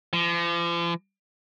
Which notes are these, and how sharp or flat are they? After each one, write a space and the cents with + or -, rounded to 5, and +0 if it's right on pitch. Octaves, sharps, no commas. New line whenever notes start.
F3 -40